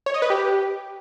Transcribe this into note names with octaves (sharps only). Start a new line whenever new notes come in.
C#5
D#5
B4
G4